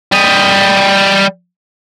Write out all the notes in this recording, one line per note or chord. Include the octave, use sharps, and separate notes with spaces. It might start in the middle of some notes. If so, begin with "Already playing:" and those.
G3 D#5